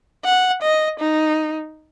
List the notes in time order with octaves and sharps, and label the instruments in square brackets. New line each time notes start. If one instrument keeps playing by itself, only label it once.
[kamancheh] F#5
D#5
D#4